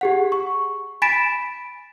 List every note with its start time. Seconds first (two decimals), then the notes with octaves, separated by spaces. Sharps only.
0.01 G4 G#4 F#5
0.32 C#6
1.02 G#5 B5 A6 B6 D7 E7